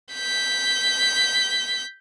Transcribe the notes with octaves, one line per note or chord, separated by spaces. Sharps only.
G6 B6